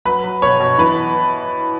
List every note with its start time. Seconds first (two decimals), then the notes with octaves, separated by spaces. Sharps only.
0.05 F#3 B4 B5
0.24 F#3
0.42 B2 C#5 C#6
0.60 B2
0.78 E3 B4 B5